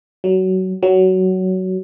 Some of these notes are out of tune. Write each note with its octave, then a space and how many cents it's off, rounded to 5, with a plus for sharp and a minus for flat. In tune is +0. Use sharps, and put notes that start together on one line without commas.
F#3 +20
F#3 +15